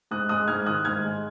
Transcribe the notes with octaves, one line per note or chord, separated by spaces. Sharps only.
G#2 D#6 F#6
G#3 D#6 F#6
G#2 F6 G#6
D#3 D#6 F#6
G#2 F6 G#6
G#3